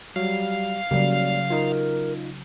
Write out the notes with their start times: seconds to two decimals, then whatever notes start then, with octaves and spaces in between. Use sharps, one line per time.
0.16 F#3 G3 F5
0.91 C#3 F#3 G3 A#3 D5
1.50 D#4 F4 A#4